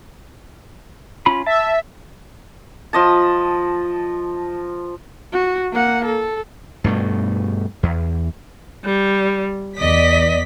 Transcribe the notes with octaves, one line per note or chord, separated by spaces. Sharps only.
C#4 F4 B5
E5 A5
F3 D#5 A5
F#4
A#3 F#5
A4
G2 B2 A3
E2
G3
E2 D5 D#5 B6